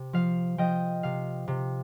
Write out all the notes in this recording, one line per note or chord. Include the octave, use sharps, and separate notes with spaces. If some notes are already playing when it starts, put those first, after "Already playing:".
Already playing: C3
F3 F5
F3 D#5 G5
C3 F5
C3